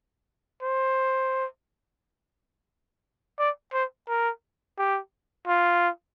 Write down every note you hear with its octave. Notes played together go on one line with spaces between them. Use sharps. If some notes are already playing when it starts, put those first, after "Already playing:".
C5
D5
C5
A#4
G4
F4